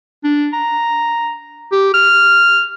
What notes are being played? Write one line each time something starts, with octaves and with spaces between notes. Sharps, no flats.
D4
A#5
G4
F6